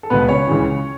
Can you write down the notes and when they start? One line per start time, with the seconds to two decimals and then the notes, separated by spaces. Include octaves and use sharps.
0.03 A4
0.10 C#2 B2 B3 B4
0.28 C#4 C#5
0.47 C#2 C#3 E3